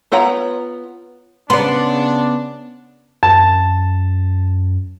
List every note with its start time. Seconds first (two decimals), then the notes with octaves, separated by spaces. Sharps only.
0.12 B3 F4 C#5 F#5 A#5
1.50 C#3 B3 D4 D5 C6
3.23 F#2 A5